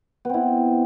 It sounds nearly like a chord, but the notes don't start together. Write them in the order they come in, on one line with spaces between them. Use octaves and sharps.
B3 C4 E4